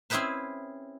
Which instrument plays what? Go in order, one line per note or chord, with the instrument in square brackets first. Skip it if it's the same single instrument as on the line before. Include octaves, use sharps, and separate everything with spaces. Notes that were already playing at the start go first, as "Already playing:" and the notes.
[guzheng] C4 C#4 E4 G#4 B4 C5